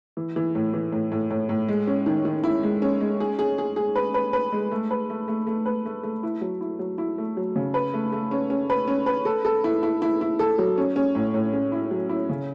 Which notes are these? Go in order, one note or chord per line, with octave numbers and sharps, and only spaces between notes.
E3
E3
A2
E3
A2
A2
A2
A2
G#3
C#4
D#3
D#3
E4
G#3
C#4
G#3
G#4
G#4
G#4
G#4
B4
B4
B4
G#3
A3
B4
A3
A3
A3
B4
A3
A3
E4
F#3
E4
F#3
E4
A3
F#3
C#3
B4
A3
A3
C#4
C#4
B4
C#4
B4
A4
A4
E4
E4
E4
E4
A4
F#3
C#4
C#4
A2
A2
C#4
E4
F#3
E4
C#3